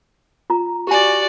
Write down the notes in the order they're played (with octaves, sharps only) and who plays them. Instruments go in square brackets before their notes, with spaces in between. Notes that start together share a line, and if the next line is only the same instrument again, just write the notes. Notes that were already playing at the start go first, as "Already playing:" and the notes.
[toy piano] F4 A#5
[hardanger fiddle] F#4 D5 [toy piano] G4 G#5